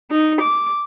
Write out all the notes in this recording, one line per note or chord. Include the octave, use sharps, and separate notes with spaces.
D#4
D6